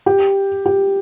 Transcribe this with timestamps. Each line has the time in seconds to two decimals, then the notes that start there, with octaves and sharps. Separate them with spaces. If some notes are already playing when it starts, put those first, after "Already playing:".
0.06 G4
0.66 G4